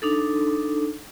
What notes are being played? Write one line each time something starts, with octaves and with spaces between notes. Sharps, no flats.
D4 D#4 A4